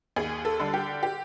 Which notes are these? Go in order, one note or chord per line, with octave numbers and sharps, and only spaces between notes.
D#2 G#4
A4
D3 G3
G4
G4